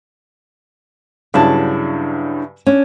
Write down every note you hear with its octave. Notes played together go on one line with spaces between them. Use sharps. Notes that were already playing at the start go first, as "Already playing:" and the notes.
G2 C#3 F#3 D4 E4 A5
C#4 D4